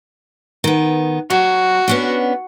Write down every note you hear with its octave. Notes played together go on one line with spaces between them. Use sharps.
D#3 B3
F#3 F#4
B3 C#4 D4